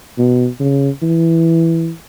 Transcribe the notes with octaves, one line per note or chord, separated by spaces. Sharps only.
B2
C#3
E3